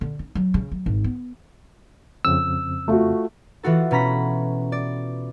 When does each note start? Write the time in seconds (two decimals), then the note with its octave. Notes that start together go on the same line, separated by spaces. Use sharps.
0.01 D3
0.19 C#4
0.35 F#3
0.54 C#3
0.72 F#3
0.86 G#1
1.04 B3
2.25 F2 C#3 C4 E6
2.88 A3 F4 F#4
3.63 E3 F4 F#4 A4
3.91 B2 C#4 A#5 B5 B6
4.72 D5